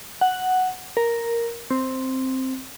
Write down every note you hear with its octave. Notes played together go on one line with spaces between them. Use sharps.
F#5
A#4
C4